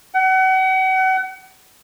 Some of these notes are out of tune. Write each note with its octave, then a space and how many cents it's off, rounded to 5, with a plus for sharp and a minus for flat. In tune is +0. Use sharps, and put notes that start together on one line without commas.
F#5 +35